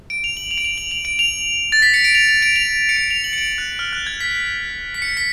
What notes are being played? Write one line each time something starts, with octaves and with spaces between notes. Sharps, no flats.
D7
F7
F#7
F7
D7
F7
F#7
F7
D7
F7
A6
B6
C#7
D7
F7
F7
D7
F7
C#7
D7
F7
F#7
C#7
D7
F#6
F6
F#6
G#6
B6
B6
C#7
B6